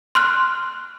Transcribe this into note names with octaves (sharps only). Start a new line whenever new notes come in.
C6 F6 F#6